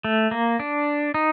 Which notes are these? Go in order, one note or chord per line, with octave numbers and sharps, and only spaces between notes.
A3
A#3
D4
D#4